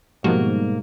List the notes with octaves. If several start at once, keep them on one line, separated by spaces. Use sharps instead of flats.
G#2 B2 D#3 F3 G3 A#3 F#4